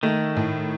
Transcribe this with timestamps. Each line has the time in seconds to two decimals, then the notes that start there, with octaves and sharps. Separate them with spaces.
0.03 D#3 A3
0.36 A2